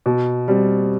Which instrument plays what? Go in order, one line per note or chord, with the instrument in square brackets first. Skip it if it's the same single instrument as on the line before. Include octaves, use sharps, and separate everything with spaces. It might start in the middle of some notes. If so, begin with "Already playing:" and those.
[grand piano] B2
G3 C4